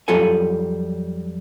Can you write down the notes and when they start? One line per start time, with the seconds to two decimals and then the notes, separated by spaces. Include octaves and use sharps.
0.08 F2 F#3 G3 F4 A4 G#5